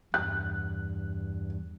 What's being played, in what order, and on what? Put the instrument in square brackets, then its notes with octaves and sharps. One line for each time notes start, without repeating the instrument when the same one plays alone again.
[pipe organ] E2 G2 [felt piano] F#6